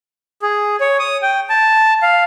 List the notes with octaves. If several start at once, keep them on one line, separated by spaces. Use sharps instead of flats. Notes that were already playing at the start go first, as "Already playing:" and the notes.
G#4
C#5
D#6
G5
A5
F5